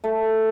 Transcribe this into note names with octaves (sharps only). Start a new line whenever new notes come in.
A3